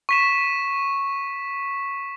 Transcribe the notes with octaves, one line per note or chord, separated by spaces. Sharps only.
C#6 B6 E7